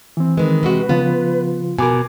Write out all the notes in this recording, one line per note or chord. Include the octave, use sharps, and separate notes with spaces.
E3 C4
D#3 G#3 B4
C3 G#3 F#4
C#3 F3 B3 F4
B2 A#4 G#5 D6 G#6